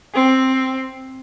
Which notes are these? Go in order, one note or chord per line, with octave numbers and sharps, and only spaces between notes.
C4